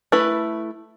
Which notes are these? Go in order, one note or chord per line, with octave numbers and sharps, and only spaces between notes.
A3 E4 B4